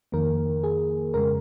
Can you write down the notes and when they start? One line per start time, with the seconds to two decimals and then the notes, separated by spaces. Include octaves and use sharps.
0.12 F2 D#3 A#3 A#4
0.63 G#4
1.14 F2 C#3 G#3 A#4